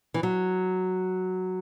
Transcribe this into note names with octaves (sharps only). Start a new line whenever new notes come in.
E3
F#3